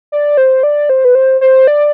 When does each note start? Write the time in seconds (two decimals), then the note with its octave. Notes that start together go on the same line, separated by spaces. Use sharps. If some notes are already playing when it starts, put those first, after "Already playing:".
0.12 D5
0.37 C5
0.63 D5
0.89 C5
1.05 B4
1.15 C5
1.41 C5
1.67 D5